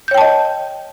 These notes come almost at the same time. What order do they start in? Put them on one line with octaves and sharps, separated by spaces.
G6 C#5 G5 A5 D#5